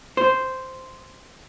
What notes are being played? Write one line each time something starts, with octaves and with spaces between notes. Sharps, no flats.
C5